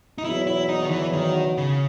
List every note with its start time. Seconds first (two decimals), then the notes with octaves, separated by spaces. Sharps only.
0.18 D#4
0.24 E2 B2 F#3 E4
0.47 E4
0.69 D#4
0.82 D#3
0.91 E3
1.13 D#3
1.57 C#3